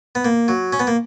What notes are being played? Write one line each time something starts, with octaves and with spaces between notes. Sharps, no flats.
B3
A#3
F#3
C#4
B3
A#3